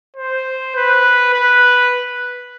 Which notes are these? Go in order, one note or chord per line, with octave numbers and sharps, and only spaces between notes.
C5
B4
B4